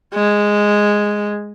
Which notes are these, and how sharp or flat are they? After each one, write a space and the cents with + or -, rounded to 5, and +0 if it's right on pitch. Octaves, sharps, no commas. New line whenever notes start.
G#3 -5